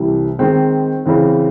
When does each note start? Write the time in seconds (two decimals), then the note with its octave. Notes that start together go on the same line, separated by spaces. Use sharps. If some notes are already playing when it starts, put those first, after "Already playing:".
Already playing: C2 C3 E3
0.39 D#3 G#3 C4
1.06 C#3 E3 C4